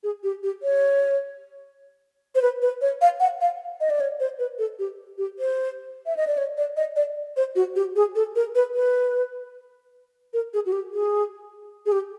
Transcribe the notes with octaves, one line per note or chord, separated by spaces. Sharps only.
G#4
G4
G4
C#5
C5
B4
B4
C#5
F5
F#5
F5
D#5
D5
C#5
C5
B4
A4
G4
G4
C5
E5
D#5
D5
C#5
D5
D#5
D5
C5
F#4
G4
G#4
A4
A#4
B4
B4
A#4
G#4
F#4
G4
G#4
G#4
G4